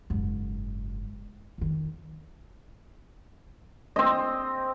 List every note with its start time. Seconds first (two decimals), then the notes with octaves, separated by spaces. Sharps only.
0.10 F#1 G#2
1.58 F2 D#3
3.96 C4 D#5